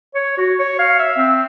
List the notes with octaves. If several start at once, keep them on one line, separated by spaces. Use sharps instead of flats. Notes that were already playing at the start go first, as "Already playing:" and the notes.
C#5
F#4
C#5
F5
E5
C4